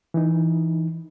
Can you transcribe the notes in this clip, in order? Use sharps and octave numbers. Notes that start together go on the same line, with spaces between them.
E3 D#4